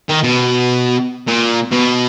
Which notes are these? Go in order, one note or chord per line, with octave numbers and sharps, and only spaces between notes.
D#3
B2
A#2
B2